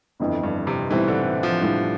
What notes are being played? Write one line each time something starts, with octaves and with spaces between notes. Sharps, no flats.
G1 F2 E3
G2
C3
B1 A2 E3 G3 C4 E4
D3
E3
F3
A2 G3 D4